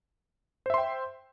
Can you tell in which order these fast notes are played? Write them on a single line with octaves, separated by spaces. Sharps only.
C5 E5 C6 G5